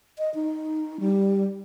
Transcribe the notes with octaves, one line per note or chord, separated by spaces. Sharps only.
D#5
D#4
G3